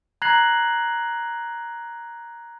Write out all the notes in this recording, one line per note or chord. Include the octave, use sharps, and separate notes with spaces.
A#5 F#6 G#6 A#6 C7 F#7